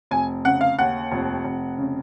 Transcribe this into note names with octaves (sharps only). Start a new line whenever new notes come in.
F1 G#5
C#3 F#5
F5
D#2 F#5
F1
F1
C#3